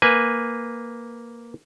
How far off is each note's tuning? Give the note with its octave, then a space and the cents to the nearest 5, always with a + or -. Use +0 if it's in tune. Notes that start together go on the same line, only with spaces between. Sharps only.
A#3 +0 B4 +0 G#5 +0